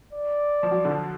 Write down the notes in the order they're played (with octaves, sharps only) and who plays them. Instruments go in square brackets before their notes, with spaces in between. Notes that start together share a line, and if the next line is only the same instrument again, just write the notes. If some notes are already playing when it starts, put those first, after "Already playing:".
[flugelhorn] D5
[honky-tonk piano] F3
F#3
D3
F3